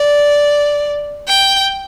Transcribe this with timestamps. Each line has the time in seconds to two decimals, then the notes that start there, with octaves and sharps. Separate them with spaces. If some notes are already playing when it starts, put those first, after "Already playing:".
Already playing: D5
1.28 G5